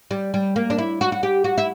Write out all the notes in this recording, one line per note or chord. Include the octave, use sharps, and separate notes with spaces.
G3
G3
A#3
D4
E4
F#4
F#4
G4
F#4
E4